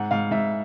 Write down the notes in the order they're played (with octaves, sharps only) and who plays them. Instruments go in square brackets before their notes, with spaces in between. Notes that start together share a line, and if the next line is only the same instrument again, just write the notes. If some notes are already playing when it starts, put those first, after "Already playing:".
Already playing: [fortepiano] G#2 [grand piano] F#5
[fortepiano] G#2 [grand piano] F5
[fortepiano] G#2 [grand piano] E5